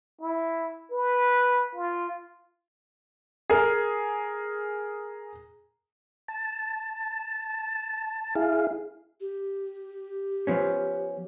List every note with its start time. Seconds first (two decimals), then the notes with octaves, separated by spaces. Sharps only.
0.21 E4
0.92 B4
1.75 F4
3.50 G#4 A#4
6.28 A5
8.35 E4 G#4 F5
9.21 G4
10.47 F3 B3 C#4